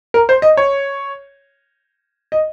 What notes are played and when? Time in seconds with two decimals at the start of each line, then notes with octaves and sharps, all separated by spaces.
0.14 A#4
0.29 C5
0.42 D#5
0.57 C#5
2.32 D#5